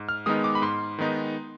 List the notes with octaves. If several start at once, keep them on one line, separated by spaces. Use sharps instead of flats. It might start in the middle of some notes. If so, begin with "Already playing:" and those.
Already playing: G#2
F6
D#3 G#3 B3 D#4 D#6
D6
B5
G#2 C6
D#3 G#3 B3 D#4